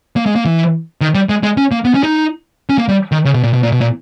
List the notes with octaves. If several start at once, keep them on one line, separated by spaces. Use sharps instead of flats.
A#3
G#3
A#3
E3
D#3
G3
G#3
G#3
C#4
A#3
B3
C#4
D#4
C#4
A#3
G3
D#3
C#3
B2
A#2
B2
A#2
B2
A#2